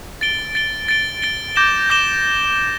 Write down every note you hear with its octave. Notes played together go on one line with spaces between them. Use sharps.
A6 D7 G7
A6 D7 G7
A6 D7 G7
A6 D7 G7
D6 G6 A#6 E7 G7
D6 G6 A#6 E7 G7